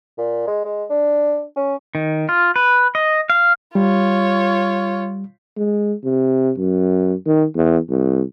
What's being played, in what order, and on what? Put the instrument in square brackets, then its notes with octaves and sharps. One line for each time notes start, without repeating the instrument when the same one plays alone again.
[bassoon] A#2
G#3
G#3
D4
C#4
[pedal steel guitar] D#3
F4
B4
D#5
F5
[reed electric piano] G3 [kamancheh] F4 C#5
[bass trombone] G#3
C3
F#2
D#3
E2
C2